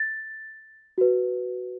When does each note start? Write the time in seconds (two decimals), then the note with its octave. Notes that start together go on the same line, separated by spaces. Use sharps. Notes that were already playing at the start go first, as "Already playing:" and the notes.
Already playing: A6
0.98 F#4 B4